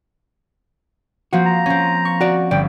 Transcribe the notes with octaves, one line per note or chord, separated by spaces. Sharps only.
F3 A#3 C4 F#4
A#5
C4 C#4
C#6
F#4 D5
G1 D5 G5